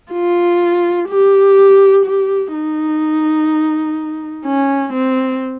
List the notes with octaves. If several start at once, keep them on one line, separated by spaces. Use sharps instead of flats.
F4
G4
G4
D#4
C#4
C4